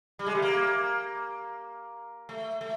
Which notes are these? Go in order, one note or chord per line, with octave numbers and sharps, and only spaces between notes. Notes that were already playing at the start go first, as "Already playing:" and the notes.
G3
G#3
A3
A#3
A3
A3